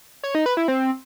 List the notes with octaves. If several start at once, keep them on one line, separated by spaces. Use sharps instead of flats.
C#5
D#4
B4
E4
C4